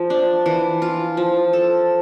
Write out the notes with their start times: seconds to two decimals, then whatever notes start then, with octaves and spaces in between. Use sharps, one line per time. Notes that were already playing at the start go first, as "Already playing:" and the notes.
Already playing: F3
0.10 D4
0.46 E3
0.82 F4
1.17 F3
1.53 A4